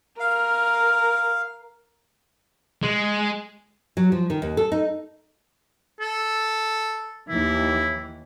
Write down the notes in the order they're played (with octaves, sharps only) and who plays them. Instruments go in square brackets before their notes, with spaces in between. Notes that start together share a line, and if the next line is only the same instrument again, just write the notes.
[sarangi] A#4 [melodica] F5
[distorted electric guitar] G#3
[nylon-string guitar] F#3
F3
D#3
D#2
A4
D#4
[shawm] A4
[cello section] D#2 E3 [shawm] E4